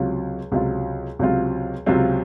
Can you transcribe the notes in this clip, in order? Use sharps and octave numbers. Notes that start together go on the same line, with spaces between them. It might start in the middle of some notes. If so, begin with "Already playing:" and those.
Already playing: C#2 C3 F#3 C4 F4
C#2 C3 F#3 C4 F4
C#2 C3 F#3 C4 F4
C#2 C3 F#3 C4 F4